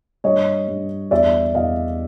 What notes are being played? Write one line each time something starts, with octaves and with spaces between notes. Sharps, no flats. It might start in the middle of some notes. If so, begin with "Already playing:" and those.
G2 C#5 D#5
G2
E2 D5 E5
E2 D#5 F5